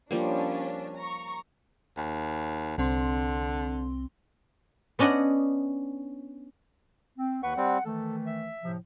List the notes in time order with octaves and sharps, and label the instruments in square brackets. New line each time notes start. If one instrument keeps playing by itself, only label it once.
[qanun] F3 G3 A#3 [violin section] C#4 D4
[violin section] A#5 C#6
[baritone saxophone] D#2
[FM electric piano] C2 C4 C6 [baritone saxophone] D3
[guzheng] B3 C#4 D4 D#5 F#5
[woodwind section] C4
[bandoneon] D#2 B4 C#6 [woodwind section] F#5
[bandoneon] G3 C4
[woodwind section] D#3 E3 A3 [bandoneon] A4
[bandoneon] E5
[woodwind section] A2 C3 F3